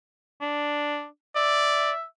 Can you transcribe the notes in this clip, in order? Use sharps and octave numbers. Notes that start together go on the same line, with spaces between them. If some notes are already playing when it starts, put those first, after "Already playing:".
D4
D5 E5